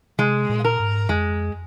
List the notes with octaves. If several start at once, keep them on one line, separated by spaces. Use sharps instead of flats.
C3 G#3
A#2
A#4
G#2
F2 G#3